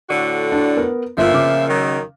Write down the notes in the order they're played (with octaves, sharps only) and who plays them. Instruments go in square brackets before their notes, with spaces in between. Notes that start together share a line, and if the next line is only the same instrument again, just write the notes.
[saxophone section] A2 D3 F#4
[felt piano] D4
B3 A#4
[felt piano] G1 F4 [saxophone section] A#2 F3 E5
[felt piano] C#3 D6
[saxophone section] D#3 F#3